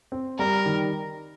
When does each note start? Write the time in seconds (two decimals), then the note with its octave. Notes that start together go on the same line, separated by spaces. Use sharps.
0.12 C4
0.39 G3 A#4
0.66 D#3